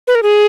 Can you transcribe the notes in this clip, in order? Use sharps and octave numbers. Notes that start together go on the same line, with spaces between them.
B4
A#4
G#4